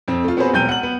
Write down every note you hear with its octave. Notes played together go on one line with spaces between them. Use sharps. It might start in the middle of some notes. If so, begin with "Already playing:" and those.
F2 C4
A3 F4
B3 C4 F#4 G#4 B4 C5
E1 F#3 G5 G6 D#7 G7
F#5 F#7
B3